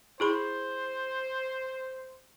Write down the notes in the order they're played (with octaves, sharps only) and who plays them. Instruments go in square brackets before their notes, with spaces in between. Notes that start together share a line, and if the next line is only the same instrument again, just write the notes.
[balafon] E4 G#4 B5 [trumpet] C5